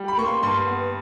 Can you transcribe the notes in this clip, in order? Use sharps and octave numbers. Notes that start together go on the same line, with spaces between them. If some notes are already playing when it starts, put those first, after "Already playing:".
Already playing: G3
B5
A#3 C#6
C6
G2 C6
B3